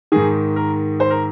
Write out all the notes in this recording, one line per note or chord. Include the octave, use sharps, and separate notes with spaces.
G#2 D#3 G#4
A#4
C5
A#4